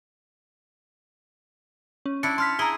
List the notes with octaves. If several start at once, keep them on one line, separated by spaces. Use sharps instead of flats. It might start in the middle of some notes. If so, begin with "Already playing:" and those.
C#4
D4 E4 C#7
A5 C6 F6 B6
E4 G#4 A#5 G7